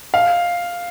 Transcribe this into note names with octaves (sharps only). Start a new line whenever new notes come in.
F5